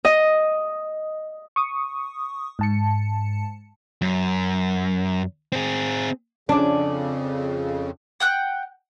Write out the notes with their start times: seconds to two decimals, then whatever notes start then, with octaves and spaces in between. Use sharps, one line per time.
0.05 D#5
1.56 C#6 D#6
2.59 G#2 A5 C#7
4.02 F#2
5.52 C4 G#4
6.49 F2 C#3 C#4 D4 D5
8.20 F#5 G5 F#6